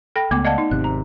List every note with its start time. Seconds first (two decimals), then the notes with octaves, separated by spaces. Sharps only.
0.16 A4 G5 B5 A#6
0.31 C#2 A3 B3 D6
0.45 D5 D#5 F5 F#5 A5 G#6
0.58 D#4
0.71 G#1 C3 F#6
0.84 A#5